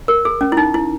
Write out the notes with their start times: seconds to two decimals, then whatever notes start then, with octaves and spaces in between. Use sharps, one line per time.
0.08 A#4
0.25 G#4
0.41 C#4
0.52 E4
0.57 D#4
0.74 E4